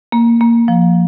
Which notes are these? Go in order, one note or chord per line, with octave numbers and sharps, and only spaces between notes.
A#3
A#3
F3